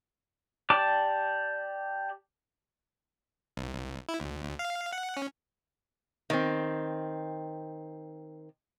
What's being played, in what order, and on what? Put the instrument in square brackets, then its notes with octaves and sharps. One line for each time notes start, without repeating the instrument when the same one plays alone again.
[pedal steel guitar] G4 D5 A5 D6
[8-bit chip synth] C2
C2
E4
D2
D2
F5
F#5
C#4
[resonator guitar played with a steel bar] D#3 C4